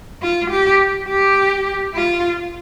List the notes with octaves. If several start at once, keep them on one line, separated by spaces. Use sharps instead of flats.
F4
G4
G4
F4